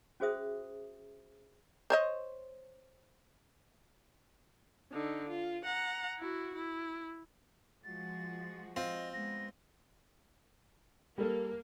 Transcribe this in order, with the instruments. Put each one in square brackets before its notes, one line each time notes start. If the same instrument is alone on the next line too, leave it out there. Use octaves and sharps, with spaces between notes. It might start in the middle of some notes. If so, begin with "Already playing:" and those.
[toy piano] C#4 F#4 G#4 C5 E5 D#6
[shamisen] C5 C#5 D#5
[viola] D3 D#4
F4
F#5 A#5
E4 F#4
E4
[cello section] F3 G#3 F#4 [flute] A6
[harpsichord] C4 F4 [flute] D#5
[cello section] G#3 B3 [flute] A#6
[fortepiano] G3 A4 [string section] A#3